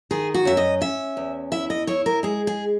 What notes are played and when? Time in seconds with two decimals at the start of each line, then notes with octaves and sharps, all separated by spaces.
0.11 D#3 G#4
0.34 F#4
0.45 F#2 E5
0.57 D#5
0.81 C#4 E5
1.17 E2
1.52 E4 E5
1.70 D#5
1.87 E4 C#5
2.06 A#4
2.23 G#3 G#4
2.47 G#4